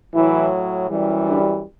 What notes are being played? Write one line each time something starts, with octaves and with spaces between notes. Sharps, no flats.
A2 E3 F#3 E4
F#2 E3 G3
D3 D4